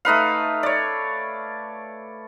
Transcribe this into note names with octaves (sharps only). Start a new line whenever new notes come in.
A3 D#4 B4 F5
C#5 D5